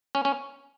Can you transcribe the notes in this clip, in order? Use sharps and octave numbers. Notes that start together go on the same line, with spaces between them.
C#4
C#4